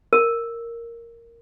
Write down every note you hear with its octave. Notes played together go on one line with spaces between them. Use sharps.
A#4